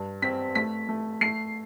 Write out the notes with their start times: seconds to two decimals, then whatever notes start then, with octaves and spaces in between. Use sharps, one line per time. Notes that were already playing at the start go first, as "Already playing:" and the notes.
Already playing: G2
0.22 C4 B6
0.55 A3 B6
0.89 A3
1.21 A3 C7